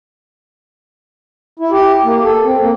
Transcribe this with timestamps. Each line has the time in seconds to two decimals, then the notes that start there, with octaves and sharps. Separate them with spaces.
1.59 E4
1.71 G4
2.05 A#3
2.24 A4
2.45 C4
2.62 A#3